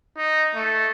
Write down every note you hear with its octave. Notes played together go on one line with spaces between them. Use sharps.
D#4
A3